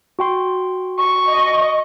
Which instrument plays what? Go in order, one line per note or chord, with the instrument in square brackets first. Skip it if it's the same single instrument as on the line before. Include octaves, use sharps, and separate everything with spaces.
[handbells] F#4 G5 C6
[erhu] C#6
[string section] D#5